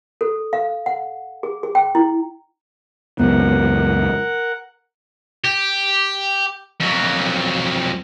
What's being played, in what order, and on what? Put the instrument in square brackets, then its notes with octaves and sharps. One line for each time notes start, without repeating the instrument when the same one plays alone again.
[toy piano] A4
F5
F#5
G#4
G#4
G5
E4
[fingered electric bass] C#2 F#2 B3 [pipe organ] A#4 F#5
[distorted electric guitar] G4
F2 F#3